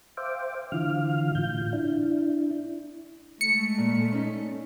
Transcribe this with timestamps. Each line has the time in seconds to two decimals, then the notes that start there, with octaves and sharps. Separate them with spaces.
0.17 C5 E5 F5 G5 D6
0.72 D3 E3 F4 F5 F6
1.35 A2 F4 G6
1.73 D4 E4
3.41 G#3 A3 C#7
3.78 A#2
4.13 C#4 D#4